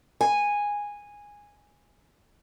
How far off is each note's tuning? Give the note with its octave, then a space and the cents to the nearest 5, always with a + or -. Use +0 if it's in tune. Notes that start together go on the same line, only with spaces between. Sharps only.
G#5 -10